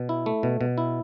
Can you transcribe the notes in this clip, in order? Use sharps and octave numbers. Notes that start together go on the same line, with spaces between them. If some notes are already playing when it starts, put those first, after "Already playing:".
Already playing: B2
E4
A3
B2
B2
E4